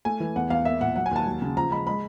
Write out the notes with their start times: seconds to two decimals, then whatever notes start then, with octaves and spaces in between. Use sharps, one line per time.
0.05 A3 G#5
0.20 E3
0.36 E2 F#5
0.50 E2 F5
0.65 A#3 E5
0.80 A#2 F#5
0.96 F#3 F#5
1.06 G#5
1.11 D#2 A5
1.27 F#3
1.42 C#3
1.56 F3 A#5
1.71 G#3 B5
1.87 G#3 B5